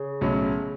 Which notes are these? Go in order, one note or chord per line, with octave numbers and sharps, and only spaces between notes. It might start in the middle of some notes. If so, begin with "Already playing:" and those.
Already playing: C#3
B1 A2 F#3 C#4